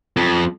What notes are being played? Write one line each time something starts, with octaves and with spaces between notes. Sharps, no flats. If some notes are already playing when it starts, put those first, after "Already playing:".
F2